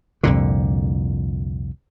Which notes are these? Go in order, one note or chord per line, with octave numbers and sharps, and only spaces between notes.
C2 F2 A#2 D3